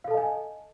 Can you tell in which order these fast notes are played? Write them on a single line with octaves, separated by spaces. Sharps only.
F5 A4 A5 D#5 G#5